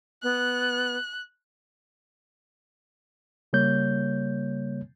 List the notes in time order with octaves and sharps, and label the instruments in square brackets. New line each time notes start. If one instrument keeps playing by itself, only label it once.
[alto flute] B3 [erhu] F#6
[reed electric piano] C#3 G3 A#3 C#5 G6